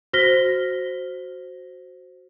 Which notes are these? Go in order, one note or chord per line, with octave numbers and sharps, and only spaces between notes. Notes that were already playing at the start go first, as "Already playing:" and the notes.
F#4 C5 F6 A#6 B6 G7